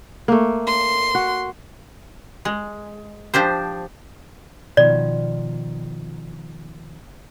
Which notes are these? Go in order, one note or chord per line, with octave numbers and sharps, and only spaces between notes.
A3 A#3
C6
F#4
G#3
F3 D4 G4 C5
B2 D#3 F3 D5